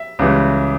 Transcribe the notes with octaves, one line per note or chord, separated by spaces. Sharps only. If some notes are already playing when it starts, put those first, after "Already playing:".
Already playing: E5
C#2 C#3 E3 G3